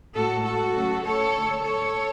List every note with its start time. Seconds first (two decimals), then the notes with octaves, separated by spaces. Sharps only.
0.15 A2 G#3 F#4 A4
0.45 F#4 A4
0.74 C#3 F#3 A3
1.04 A4 C#5
1.34 D3 A3
1.64 A4 C#5